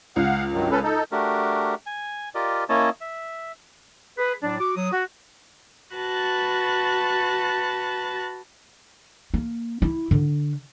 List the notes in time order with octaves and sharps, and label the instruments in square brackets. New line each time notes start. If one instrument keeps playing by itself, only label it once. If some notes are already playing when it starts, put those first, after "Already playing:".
[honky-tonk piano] C#2 [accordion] F5 F#5
[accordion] G2 D#3 F#3
C#4 A4 B4
D#4 A4
[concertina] A3 D4 F#4 G4 A#4
G#5
F4 G4 A#4 D5 D#5
A#3 C#4 E4 C#5 D#5 A5
E5
[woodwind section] G#4 B4
A2 F#3 D4
F#4 D6
F#3 D#6
F#4
[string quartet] F#4 B4 A5 F#6 A6
[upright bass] A#3
E4
D3